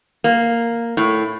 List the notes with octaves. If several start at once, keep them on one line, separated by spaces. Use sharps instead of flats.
A#3
A2